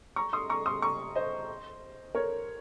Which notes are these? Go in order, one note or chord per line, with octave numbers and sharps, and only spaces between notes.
A#5 C#6
C6 D#6
A#5 C#6
C6 D#6
A#5 C#6
C5 D#5
A#4 C#5